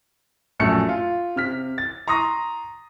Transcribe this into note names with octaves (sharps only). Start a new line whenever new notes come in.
A#1 F#2 A3 C#7
F4
C3 F6 B6
A6
A#5 C6 C#6 D#6 A#6